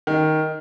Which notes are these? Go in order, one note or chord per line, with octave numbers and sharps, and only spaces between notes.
D#3